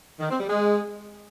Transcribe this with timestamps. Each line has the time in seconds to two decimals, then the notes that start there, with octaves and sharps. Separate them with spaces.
0.20 D#3
0.30 C4
0.39 G3
0.49 G#3